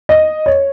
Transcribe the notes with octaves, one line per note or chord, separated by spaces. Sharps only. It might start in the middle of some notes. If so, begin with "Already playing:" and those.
D#5
C#5